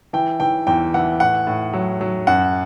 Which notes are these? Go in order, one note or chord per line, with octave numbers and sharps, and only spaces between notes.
E3 G5
E3 G5
E2 G5
E3 F#5
A2 F#5
A2
F#3
F#3
F#2 F#5